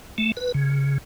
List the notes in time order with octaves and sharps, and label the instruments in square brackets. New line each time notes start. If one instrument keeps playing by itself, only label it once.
[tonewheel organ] A3
B4
C#3